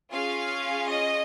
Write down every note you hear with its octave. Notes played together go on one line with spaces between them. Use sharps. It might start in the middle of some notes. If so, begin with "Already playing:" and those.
C#4 F4 G#4 F5
D#5